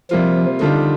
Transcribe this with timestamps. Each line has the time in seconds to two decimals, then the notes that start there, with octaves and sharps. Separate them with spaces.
0.11 C3 F3 G3 A#3 F4
0.61 D3 D#3 G3 D4 F4